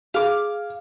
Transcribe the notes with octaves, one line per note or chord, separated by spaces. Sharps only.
G#4 F5 D6